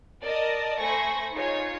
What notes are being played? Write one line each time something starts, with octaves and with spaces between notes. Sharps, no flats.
A#4 D5 D#5 A5
A3 C5 G#5 B5 C#6 A#6
D#4 F4 G#4 C#5